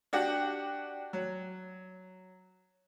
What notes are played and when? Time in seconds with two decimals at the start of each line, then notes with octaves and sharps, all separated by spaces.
0.13 D4 F#4 G4
1.13 F#3